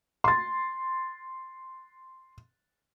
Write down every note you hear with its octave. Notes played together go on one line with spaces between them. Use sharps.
C6 A6